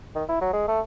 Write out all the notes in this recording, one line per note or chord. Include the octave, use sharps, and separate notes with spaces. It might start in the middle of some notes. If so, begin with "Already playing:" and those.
D#3
E4
F#3
G#3
A3